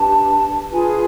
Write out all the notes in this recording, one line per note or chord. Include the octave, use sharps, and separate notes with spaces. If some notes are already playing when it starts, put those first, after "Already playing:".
Already playing: D4 G4 B4 A5
F4 G#4 B4 G#5